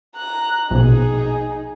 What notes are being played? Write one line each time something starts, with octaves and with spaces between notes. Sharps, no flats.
A#5 F#6
A#1 B2 D#4 G#4